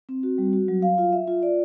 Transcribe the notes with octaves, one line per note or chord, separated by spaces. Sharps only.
C4
F#4
G3
F#4
F#3
F5
F4
E5
F4
D5